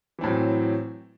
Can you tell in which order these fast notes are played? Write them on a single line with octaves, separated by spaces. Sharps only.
E3 C4 A2 F#3